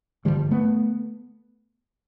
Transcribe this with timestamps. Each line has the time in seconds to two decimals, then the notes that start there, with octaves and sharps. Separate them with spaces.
0.25 G1 G2 D3 F3 G3
0.51 A3 B3